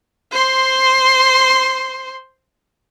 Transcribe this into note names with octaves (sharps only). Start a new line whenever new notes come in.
C5 C6